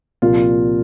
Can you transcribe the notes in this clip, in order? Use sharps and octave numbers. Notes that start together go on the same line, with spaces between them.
C2 A#2 F3 A#3 F4